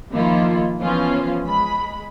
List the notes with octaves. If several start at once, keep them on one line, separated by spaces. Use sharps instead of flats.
D#3 F3 A#3 E4 F4
E3 F3 B3 C#4 F4 C5
G#3 B5